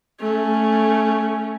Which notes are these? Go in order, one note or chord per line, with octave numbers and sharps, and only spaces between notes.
A3 C#4